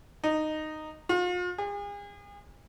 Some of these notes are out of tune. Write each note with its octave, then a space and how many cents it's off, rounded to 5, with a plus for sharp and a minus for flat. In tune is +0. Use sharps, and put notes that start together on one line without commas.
D#4 -10
F4 +40
G#4 -40